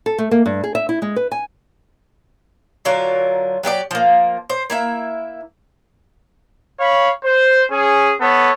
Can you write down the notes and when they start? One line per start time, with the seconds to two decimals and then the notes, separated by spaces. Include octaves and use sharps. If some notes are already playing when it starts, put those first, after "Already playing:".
0.06 A4
0.18 A3
0.31 A#3
0.46 G2
0.64 G#4
0.75 E5
0.89 E4
1.02 G#3
1.16 B4
1.31 G#5
2.85 D3 F#3 F4 A#4
3.63 F#3 G4 A4 D5
3.91 F3 A#3
4.50 C5
4.70 A#3 E4 E5
6.80 C#5 F5 B5
7.24 C5
7.71 C#4 G#4
8.21 B3 A4 C#5